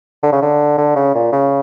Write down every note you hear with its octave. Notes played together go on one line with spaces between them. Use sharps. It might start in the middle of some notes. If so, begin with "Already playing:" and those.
D3
C#3
D3
D3
C#3
A#2
C#3